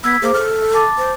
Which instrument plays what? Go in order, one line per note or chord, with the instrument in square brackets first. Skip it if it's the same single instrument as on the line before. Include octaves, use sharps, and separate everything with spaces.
[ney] B3 [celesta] E6 G#6 B6
[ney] A#3 [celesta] G#4 C5 D6
[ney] A4 [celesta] F6
[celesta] A5 D6 A6
[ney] C5